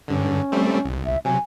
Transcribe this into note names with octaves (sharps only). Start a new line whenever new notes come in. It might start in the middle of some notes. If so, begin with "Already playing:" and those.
G2 D3 C#4
G3 A3 C4
C2
E5
C3 F#3 G#5